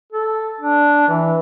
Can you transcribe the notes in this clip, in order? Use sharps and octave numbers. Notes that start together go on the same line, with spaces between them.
A4
D4
E3